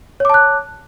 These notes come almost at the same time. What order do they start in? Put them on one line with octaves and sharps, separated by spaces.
C#5 D6 A5 F#6